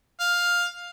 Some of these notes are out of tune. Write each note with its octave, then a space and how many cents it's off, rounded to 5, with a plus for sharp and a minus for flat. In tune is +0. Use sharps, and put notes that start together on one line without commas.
F5 +10